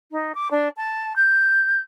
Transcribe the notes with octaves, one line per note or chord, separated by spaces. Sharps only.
D#4
D6
D4
A5
G6